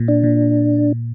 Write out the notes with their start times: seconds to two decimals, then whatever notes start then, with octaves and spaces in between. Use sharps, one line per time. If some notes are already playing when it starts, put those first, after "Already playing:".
Already playing: A#2
0.08 D4
0.24 A#2